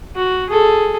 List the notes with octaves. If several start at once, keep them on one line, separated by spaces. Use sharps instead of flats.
F#4
G#4 A4